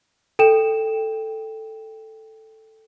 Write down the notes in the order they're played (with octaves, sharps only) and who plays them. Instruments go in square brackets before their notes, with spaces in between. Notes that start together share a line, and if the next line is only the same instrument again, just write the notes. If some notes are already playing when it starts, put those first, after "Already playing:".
[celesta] A4 G5 E7